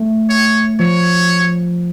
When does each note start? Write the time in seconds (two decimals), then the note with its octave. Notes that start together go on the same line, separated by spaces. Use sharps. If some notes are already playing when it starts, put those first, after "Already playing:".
Already playing: A3
0.29 C#5
0.79 F3 C#5